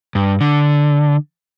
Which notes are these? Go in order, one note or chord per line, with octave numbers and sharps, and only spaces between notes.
G2
D3